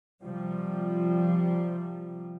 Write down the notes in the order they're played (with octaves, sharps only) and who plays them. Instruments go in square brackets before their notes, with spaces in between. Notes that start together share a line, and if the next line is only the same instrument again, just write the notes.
[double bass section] C3 F3 G3